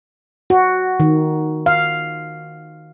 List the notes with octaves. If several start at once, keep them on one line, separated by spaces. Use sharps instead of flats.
F#4
D#3
F5